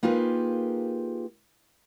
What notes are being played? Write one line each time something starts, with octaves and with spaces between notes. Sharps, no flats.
A#3 D#4 F4 G4 G#4 B4